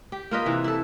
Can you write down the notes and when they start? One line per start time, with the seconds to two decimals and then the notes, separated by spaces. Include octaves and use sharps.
0.12 G4
0.31 A#3 F4 B4 D#5
0.46 C3 E3
0.64 E4 A4